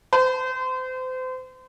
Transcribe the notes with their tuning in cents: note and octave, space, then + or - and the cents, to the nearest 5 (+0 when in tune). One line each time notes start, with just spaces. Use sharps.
C5 -35